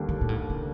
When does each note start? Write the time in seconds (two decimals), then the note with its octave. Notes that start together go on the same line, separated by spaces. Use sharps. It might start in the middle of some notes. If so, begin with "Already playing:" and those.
Already playing: D#2 D3 G3 A#3 D4
0.09 D#3
0.21 A#2
0.29 A2
0.50 C#3